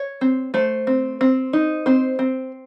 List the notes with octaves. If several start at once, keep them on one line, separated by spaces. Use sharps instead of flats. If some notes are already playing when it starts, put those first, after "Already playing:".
Already playing: C#5
C4
A3 C5
C4
C4
D#4
C4 C5
C4